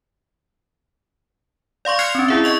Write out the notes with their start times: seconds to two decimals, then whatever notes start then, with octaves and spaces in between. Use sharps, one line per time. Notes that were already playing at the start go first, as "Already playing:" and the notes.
1.85 D5 F5 C6 C#6
1.99 F6 F#6 G#6 C7 C#7 F7
2.15 C4 C#4
2.28 E4 G#4 E5
2.44 D#5 C#6 F7